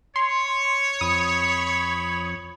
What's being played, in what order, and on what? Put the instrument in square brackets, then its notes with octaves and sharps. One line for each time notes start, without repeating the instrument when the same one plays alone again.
[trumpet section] C#5 [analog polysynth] C6
[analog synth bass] F2 [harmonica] B5 [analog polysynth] D#6